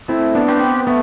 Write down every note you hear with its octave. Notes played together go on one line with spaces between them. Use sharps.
A3 C4 E4
B3 D4
C4 G4 B4
B3
A3 B3